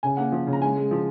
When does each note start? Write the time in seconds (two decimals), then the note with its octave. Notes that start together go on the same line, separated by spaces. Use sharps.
0.03 C#3 G#5
0.17 A#3 F#5
0.32 F3
0.47 C#3
0.53 A#5
0.62 G#3 G#5
0.76 G#3
0.91 F3